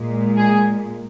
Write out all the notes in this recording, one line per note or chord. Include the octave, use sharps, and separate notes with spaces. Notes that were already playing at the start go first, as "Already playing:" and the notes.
Already playing: A#2 G#3
G#4